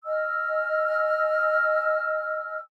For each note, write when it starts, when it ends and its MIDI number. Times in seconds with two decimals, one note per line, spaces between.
0.05 2.60 75
0.05 2.60 80
0.05 2.60 88
0.05 2.60 89